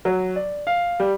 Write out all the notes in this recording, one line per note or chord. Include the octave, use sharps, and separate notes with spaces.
F#3
D5
F5
G3